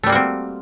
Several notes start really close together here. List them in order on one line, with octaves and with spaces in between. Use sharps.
A3 G3 A#3 F#4 C4